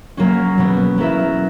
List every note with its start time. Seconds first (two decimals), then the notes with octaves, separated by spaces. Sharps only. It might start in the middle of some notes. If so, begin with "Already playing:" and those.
0.17 F#3 A#3 C#4 F#4 A#4
0.58 B2 F#3 B3 F#4
0.98 F#3 B3 E4 A#4 E5